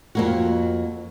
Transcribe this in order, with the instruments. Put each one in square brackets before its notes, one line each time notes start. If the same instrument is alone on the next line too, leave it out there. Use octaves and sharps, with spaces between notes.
[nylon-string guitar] F2 A#3 F#4